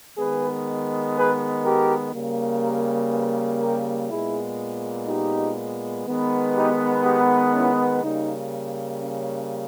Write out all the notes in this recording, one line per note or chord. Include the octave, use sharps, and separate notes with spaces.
D#3 G#3 B3 G#4 B4
G#4 B4
G4 A#4
C#3 G3 A#3
G4 A#4
G#4 B4
G4 A#4
A#2 G#3 B3 E4 G#4
D#4 G4
D#3 G#3 B3
D#4 G4
D#4 G4
C#4 E4
C#3 G3 A#3 D#4
C#4